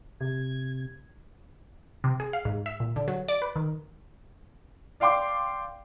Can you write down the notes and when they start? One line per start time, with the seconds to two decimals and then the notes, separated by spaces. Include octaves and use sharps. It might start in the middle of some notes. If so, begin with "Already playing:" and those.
0.21 C3 G#6
2.04 C3
2.20 G#4
2.33 F5
2.45 G#2
2.66 E5
2.80 A#2
2.96 D3
3.08 F#3
3.29 D5
3.42 B4
3.56 D#3
5.00 D5 F5 G5 C6 D6